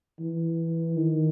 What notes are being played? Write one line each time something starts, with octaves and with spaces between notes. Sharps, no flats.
E3
D#3